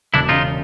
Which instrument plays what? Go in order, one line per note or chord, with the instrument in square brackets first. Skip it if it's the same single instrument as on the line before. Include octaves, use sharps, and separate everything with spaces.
[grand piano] E1 [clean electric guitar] D4 E4
[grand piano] C#3 [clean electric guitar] D#4 F4